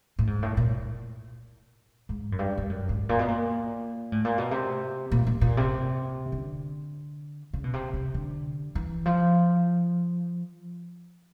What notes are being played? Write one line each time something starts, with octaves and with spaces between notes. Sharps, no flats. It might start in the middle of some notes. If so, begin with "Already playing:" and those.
A2
G#2
A2
A#2
G#2
F#2
G2
G2
F#2
G#2
A#2
B2
A#2
A2
A#2
B2
C3
A#2
A#2
A#2
C3
D3
C#3
B2
C3
C3
D3
E3
F3